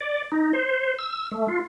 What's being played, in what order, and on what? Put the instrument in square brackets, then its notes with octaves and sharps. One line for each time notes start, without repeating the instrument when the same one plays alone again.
[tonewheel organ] D5
D#4
C5
E6
A3
F4